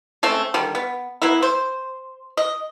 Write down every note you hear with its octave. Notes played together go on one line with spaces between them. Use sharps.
G#3 A3 C4 C#4
D3 D#3 G3
B3
F#3 A#3 B3 E4
C5
D#5